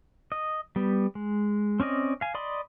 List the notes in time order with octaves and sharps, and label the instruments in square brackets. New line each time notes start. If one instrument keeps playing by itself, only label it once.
[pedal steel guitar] D#5
G3 B3
G#3
C4 C#4 D5 D#5
F5 G#5
D5 D#5 B5 C6